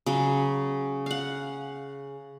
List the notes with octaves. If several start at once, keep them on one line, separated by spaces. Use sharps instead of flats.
C#3 F#3
F5 F#5